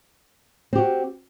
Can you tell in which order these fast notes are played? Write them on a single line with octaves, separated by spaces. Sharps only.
C4 G4 F#4